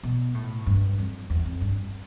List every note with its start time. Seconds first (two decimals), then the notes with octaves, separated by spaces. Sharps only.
0.03 B2
0.34 A2
0.66 G2
0.98 F2
1.30 E2
1.46 F2
1.61 G2